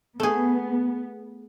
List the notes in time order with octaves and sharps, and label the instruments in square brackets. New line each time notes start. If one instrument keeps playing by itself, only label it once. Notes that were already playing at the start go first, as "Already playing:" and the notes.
[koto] A3 G#4 [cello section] B3